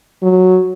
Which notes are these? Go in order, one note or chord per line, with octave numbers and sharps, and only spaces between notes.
F#3